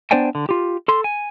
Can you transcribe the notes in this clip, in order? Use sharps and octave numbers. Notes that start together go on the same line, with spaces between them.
B3 D4 C5 D5 G5 G#5
D3
F4 G4
A4 C6
G#5